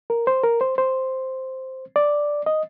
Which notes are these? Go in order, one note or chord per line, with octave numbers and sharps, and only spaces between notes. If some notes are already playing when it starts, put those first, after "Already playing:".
A#4
C5
A#4
C5
C5
D5
D#5